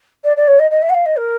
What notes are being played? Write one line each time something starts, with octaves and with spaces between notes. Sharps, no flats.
D5
D5
C#5
D#5
D#5
E5
F#5
F5
D#5
A#4